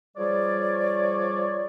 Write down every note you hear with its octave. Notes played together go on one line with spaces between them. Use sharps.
F3 G3 G#4 C#5 D5